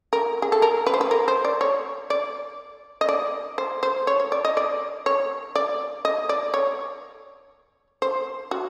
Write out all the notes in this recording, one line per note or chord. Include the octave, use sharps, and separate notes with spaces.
A#4
G#4
A4
A#4
B4
C5
B4
A#4
C5
D5
C#5
D5
D#5
D5
C5
C5
C#5
C#5
D5
D#5
D5
C#5
D5
D#5
D5
C#5
C5
F#4